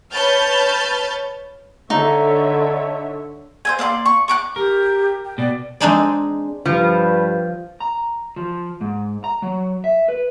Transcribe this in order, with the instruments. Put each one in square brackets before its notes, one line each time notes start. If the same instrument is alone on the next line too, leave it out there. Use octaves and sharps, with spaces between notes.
[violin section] B4 C#5 A5 F6 G6 A6
[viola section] D3 C#5 E5 [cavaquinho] D#4
[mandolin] C5 E5 G#5
A#3 D5 E5 C6
C#6
C#6 D6 F#6
[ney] G4 [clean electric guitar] A#4
[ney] G5
[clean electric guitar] B2 [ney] D5
[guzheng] G#3 C4 D4 D#4 G#4 D5
[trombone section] G2 B4 [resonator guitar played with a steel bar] F3
[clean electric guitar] A#5
F3
G#2
A#5
F#3
E5
B4